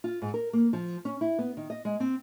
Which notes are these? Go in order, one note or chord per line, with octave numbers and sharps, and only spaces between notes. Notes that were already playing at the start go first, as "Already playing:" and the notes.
F4
G#2
A#4
A#3
F3
C#4
E4
B3
D#3
D#5
G#3
C4